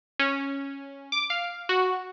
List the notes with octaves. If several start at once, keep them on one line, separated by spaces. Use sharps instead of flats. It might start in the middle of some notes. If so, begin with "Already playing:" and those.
C#4
D6
F5
F#4